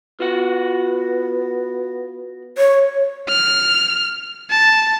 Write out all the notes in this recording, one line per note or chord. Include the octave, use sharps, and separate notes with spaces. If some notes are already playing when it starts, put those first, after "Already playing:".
B3 F4 F#4 F#5
C#5
F6
A5